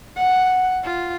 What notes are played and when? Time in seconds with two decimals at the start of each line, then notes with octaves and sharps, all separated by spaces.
0.16 F#5
0.84 F4